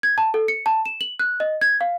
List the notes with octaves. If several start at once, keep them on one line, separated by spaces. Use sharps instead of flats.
G#6
A5
A4
C#7
A5
E7
F#7
F#6
D#5
G#6
F5